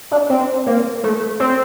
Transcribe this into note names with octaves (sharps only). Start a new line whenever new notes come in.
D4
C4
A#3
A3
C4